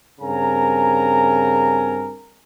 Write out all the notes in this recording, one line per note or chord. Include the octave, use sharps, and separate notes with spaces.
G2 C#3 C4 A#4 G#5 A#5